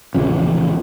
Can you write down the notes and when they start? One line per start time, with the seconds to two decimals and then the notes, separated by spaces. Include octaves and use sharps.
0.14 E1 A#1 E2 C#3